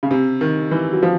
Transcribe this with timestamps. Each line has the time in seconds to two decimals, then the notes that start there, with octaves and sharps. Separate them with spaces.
0.03 C#3
0.11 C3
0.41 D#3
0.71 E3
0.93 F#3
1.03 F3